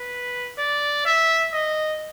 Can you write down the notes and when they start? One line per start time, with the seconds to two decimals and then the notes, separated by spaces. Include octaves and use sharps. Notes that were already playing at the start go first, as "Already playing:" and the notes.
Already playing: B4
0.58 D5
1.05 E5
1.53 D#5